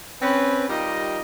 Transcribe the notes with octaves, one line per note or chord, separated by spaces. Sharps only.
C4 C#4 B4
G3 D#4 F4 G4 A#4 D#5